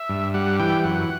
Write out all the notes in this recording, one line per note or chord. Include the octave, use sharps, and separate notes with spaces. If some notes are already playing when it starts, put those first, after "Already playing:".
Already playing: E5
G2
G3 F#5
E3 G5
F#2 F#5